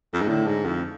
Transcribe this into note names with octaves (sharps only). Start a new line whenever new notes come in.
F2
G#2
A2 D3
G#2
F2